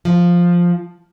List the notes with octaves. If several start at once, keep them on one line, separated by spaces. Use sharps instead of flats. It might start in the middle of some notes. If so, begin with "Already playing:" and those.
F3